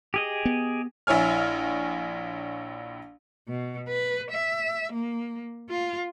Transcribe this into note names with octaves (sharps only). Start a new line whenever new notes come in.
G4 G#4 D#5
B3
A#1 E4 C#5 G#5 F6
B2
B4
E5
A#3
F4